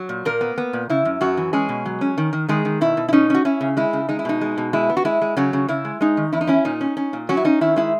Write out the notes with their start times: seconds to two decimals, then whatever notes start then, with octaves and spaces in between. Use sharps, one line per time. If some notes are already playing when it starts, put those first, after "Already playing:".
Already playing: F#3
0.09 A#2
0.25 A#2 A#3 A#4
0.41 B3
0.58 B3
0.73 A#2
0.90 C#3 E4
1.05 F#2
1.21 F#2 F#3 F#4
1.37 E3
1.53 G#3 C#4 G#4
1.69 B2
1.86 F#3
2.01 C#4
2.18 D#3
2.33 D#3
2.49 D#3 G#3 G#4
2.65 D#3
2.81 B2 E4
2.97 B2
3.09 E4
3.13 C#4 D#4
3.30 C#4 F#4
3.45 C#4 E4
3.61 C#3
3.77 G#3 E4
3.93 C#3
4.09 G#3 D#4
4.19 E4
4.25 B2 D#4
4.41 G#3
4.58 B2
4.73 G#3 E4
4.90 B3
4.97 F#4
5.05 G#3 E4
5.22 G#3
5.37 C#3 F#3 F#4
5.53 C#3
5.69 C#3 E4
5.85 G#3
6.01 G#3 D#4
6.17 D#3
6.33 E2 E4
6.41 D#4
6.47 C#4 E4
6.65 A#2 D#4
6.81 C#4
6.97 C#4
7.13 A#2
7.29 F#3 C#4 F#4
7.37 E4
7.44 C#4 D#4
7.61 D#3 E4
7.76 G#3 E4